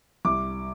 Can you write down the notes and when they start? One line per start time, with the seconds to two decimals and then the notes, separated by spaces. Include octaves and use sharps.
0.25 C2 D6